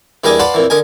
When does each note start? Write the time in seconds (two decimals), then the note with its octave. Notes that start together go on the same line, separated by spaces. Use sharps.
0.24 E2 G3 A#3 D4 D#5 G#5
0.40 B4 D5 F5 F#5 A5 C6
0.54 F2 A#2 E3
0.70 D3 A#4 D#5 G#5